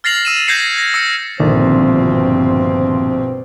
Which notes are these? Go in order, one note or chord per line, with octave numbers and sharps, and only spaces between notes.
F6 A6 A#6 C7 F7 F#7
E6 D#7 E7
G6 G#6 A#6 C7 C#7 F#7
A#6
E6 A#6 C#7
A#1 G2 B2 D3 D#3 F3 C4 C5